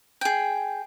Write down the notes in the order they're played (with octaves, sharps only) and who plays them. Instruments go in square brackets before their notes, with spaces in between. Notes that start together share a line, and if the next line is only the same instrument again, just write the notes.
[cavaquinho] G#4 G5